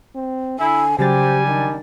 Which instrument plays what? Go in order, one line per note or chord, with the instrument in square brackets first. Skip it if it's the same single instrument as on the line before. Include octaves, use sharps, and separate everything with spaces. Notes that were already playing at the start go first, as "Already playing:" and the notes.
[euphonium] C4
[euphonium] D3 [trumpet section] E4 [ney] G#5
[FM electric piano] C#3 F#3 A6 [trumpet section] G3 G#5 [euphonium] G4 [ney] C5
[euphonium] D#3 [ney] D4